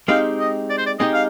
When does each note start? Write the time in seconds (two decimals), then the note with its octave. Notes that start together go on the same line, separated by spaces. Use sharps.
0.08 G#3 C4 D#4 G4 F5
0.39 D#5
0.70 D5
0.78 C5
0.86 D5
0.99 G#3 C4 D#4 G4 D#5
1.14 F5